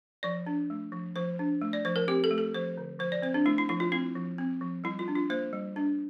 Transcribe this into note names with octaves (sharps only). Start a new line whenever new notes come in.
F3 D5
D4
A3
F3
F3 C5
D4
A3
D5
F3 C5
A#4
C4 G4
A4
A3
A4
F3 C5
D3
F3 C5
D5
C4 C5
D4
A3 E4
E4
F3 E4
F4
C4 E4
F3
C4
F3
G3 E4
F4
D4
F4
A#3 C5
G3
D4